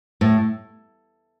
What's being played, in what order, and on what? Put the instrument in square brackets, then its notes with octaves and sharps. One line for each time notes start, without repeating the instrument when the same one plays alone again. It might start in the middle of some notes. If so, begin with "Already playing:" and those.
[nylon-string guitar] A2